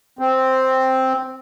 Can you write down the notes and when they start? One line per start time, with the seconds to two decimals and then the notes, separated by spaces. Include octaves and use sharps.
0.19 C4